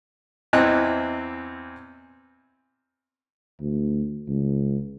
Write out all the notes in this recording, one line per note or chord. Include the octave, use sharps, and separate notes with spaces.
E2 E3 C4 D#5 F#6
D2
C#2